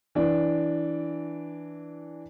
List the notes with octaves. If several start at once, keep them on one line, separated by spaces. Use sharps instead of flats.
E3 D4